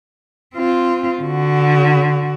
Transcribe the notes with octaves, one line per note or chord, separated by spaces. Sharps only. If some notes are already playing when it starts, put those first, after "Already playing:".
C4 F4
D3 F#4